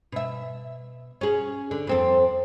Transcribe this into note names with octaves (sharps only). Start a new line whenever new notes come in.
B2 E5
C#4 G#4
D3
F2 C4 A4